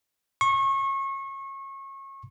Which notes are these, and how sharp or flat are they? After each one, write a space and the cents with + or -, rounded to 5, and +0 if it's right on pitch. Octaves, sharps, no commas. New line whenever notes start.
C#6 -30